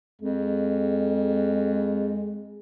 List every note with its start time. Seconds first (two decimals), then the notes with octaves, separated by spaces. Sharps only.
0.22 F2 G#3